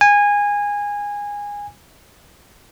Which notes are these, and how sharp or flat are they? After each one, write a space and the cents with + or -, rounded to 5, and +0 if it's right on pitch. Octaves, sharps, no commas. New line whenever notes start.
G#5 -20